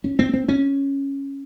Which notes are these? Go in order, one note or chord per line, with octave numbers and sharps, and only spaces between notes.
C#4
C4
C4
C#4